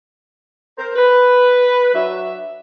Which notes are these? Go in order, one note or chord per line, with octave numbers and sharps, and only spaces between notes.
A#4 C5
B4
F#3 D4 F#4 E5